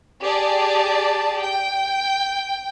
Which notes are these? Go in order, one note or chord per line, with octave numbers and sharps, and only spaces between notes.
G4 G#4 D5 A5
G5